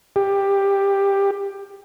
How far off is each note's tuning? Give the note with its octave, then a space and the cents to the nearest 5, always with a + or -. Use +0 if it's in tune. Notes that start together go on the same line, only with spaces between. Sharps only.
G4 +15